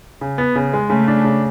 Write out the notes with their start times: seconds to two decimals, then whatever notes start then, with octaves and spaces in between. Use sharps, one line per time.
0.21 C#3
0.38 B3
0.56 C#3
0.73 G#3
0.90 C#3 A3
1.08 D4
1.24 C#3